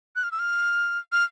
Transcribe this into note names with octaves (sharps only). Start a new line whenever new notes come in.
F#6
F6
E6
F6
F6